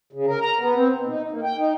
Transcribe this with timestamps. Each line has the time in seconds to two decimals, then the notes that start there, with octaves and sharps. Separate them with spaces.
0.13 C#3
0.26 A#4
0.42 A#5
0.59 B3
0.75 C4
0.92 B2
1.07 D#4
1.32 A#3
1.44 G5
1.58 D#4